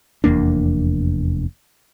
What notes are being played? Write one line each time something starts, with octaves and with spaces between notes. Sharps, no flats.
F1 E2 A#3 D4